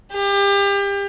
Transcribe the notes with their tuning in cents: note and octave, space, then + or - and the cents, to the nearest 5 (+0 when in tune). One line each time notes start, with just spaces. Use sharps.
G4 +30